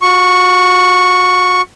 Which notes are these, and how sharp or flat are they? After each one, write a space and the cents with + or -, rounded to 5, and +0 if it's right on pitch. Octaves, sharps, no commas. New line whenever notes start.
F#4 -40 C#6 +0